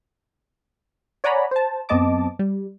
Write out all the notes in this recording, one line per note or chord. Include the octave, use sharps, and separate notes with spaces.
C#5 D5 F#5 G#5 A#5 B5
C5 A5
F#2 B3 C4 D#5 A5 D6
G3